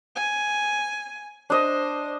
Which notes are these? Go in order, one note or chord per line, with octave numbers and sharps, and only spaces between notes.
G#5
D4 C5 D#5